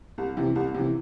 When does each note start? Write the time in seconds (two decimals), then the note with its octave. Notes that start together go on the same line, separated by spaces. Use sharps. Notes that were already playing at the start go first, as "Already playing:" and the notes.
0.18 C2
0.37 C3 E3
0.56 C2
0.74 C3 E3